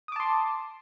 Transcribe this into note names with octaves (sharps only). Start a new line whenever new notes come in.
A5 C6 D6 D#6